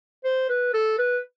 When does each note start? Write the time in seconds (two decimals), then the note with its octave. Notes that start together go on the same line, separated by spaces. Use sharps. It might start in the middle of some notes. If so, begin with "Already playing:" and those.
0.24 C5
0.49 B4
0.74 A4
0.98 B4